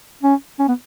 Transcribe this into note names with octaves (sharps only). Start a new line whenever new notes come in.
C#4
C#4
B3